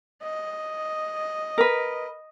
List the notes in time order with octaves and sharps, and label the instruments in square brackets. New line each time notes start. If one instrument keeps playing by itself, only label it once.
[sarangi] D#5
[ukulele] A#4 B4